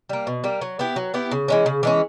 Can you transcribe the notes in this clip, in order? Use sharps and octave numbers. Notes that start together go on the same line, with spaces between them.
G3 A#3
B2
G3 A#3
F#3
B3 E4 G4
F#3
B3 E4 G4
C#3
E3 G#3 C#4
C#3
E3 G#3 C#4